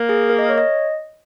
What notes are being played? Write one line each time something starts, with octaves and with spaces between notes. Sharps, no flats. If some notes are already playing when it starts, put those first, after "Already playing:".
Already playing: A#3
G#4
A#4
D#5
C#5
D#5